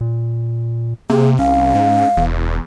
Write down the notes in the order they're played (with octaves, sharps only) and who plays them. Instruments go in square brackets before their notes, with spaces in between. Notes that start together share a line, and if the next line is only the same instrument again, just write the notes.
[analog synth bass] A#2
[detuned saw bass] C3 [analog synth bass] A#3 [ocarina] G#4
[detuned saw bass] C2 [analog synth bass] C#4 [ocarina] F5
[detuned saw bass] G#2
[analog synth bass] E1 [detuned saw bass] E2